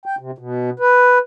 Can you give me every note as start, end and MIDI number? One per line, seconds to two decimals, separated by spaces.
0.06 0.15 79
0.19 0.31 48
0.38 0.70 47
0.80 1.18 71